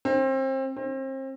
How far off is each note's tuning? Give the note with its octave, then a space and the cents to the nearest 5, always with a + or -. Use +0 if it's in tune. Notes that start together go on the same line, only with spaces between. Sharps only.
C4 +30
C4 +35